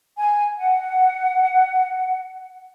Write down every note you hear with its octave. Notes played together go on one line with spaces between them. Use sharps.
G#5
F#5